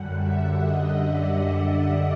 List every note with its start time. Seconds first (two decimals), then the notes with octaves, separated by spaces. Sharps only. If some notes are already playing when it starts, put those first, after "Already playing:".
Already playing: F#2 D3 G3 F#5
0.18 E5
0.61 D#5
1.05 D5